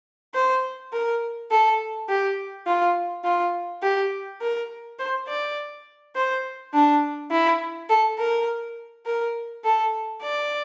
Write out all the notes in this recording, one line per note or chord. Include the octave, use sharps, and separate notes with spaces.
C5
A#4
A4
G4
F4
F4
G4
A#4
C5
D5
C5
D4
E4
A4
A#4
A#4
A4
D5